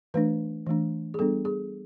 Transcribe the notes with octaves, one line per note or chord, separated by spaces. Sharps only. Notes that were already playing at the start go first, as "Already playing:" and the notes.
E3 A3 D4 B4
E3 A3 D4
G#4
G3 B3 D4 A4
G#4